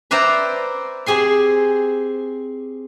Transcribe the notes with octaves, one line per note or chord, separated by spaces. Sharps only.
B4 C5 D5 E5 G5 A#5
C4 G4 G#4 G#5 C6